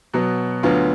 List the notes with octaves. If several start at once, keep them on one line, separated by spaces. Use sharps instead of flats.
B2 F#3 B3
D2 D3 F#3 B3 F4